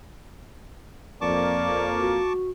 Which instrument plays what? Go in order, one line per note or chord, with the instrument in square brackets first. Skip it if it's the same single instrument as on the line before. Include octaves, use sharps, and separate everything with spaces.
[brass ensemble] F2 A#3 [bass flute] D5 [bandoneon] A5 C#6 D6
[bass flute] F#4